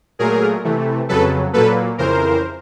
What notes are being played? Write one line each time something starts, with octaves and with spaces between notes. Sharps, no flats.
A#2 F#3 A3 G#4 A#4
C3 E3 A3
F2 C#3 F#3 A4 B4
A#2 F#3 A#3 A4 B4
F2 C#3 E3 A#4 C5